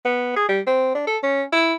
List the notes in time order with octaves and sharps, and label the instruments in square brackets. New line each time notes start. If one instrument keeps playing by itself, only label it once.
[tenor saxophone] B3
G#4
G3
C4
D4
A4
C#4
E4